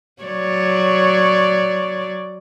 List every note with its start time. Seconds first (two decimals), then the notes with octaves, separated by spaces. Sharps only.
0.22 F#3 C#5 D5